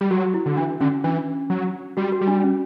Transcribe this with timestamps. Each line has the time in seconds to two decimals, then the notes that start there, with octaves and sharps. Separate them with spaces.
0.01 G3
0.11 F#3 F#4
0.34 E4
0.46 D3
0.57 E3 D4
0.80 D3 C#4
1.04 E3 D4
1.50 F#3
1.97 G3 F#4
2.12 F#4
2.21 G3
2.28 D4
2.44 C#4